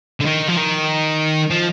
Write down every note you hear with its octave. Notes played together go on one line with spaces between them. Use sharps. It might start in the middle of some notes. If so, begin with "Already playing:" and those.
D3
D#3
F3
D#3
F3